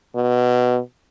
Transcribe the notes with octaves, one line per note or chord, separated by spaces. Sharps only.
B2